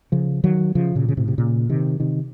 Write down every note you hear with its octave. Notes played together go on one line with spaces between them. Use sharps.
C#3 F3
D#3 F#3
C#3 F3
A#2 C#3
C#3
A2 C3
C3
A#2 C#3
C3 D#3
C3 D#3